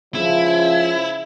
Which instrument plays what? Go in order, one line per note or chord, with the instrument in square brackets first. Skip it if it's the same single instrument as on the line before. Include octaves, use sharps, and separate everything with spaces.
[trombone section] C#2 C#3 F3 [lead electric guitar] E4